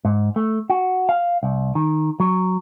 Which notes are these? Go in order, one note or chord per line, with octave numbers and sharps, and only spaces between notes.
G#2
A3
F#4
F5
C2
D#3
F#3